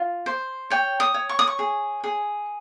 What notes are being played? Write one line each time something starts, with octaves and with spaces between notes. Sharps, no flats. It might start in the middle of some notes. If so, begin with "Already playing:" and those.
Already playing: F4
C5
C#5 G5
D#6
C#5
C#6
D#6
C#6
G#4
G#4